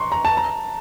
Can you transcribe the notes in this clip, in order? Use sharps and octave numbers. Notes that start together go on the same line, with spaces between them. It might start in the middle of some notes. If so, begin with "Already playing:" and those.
Already playing: A#5 C6 C#6
A#5
A5
A#5